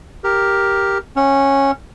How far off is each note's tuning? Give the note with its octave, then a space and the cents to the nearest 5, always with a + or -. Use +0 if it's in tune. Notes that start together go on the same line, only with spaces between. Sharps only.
G4 +0 A#4 +0
C#4 -15 F#5 +0